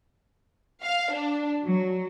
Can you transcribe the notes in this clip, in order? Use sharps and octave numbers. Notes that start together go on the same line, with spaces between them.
F5
D4
F#3